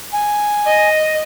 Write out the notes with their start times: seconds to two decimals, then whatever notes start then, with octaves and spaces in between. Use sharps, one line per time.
0.13 G#5
0.67 D#5